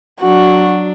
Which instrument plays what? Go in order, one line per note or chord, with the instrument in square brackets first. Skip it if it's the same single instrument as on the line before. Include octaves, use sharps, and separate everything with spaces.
[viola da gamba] F#3 D4 [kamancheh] F#4